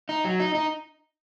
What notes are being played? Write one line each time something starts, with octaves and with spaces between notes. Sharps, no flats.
D#4
F#3
D#4
D#4